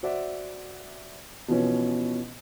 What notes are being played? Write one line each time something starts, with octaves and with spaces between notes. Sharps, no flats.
F#4 C5 D5 E5 F#5
B2 E3 F3 B3 C#4